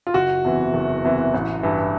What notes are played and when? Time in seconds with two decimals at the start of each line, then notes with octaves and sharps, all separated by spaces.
0.07 F4
0.14 F#1 F#4
0.44 E2 C3 E3
0.74 F#1
1.04 E2 C3 E3
1.34 A1
1.63 G2 E3